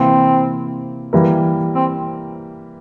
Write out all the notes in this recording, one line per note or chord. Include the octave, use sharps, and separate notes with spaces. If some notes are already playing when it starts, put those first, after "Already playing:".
Already playing: C3 E3 A#3 C4 E4
E3 G3 A#3 E4 A#4
C4